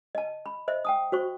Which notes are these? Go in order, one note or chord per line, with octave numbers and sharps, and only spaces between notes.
D#5 A5
B5
C5 D#5 E5
G5 A5 D#6
F#4 C5 C#6